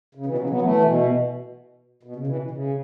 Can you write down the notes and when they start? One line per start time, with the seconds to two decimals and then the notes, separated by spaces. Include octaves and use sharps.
0.15 C#3
0.26 B2 E3
0.38 C#3 F#3
0.49 F#3 B3
0.62 E3 A3
0.85 B2
2.03 B2
2.16 C#3
2.27 B2 E3
2.51 C#3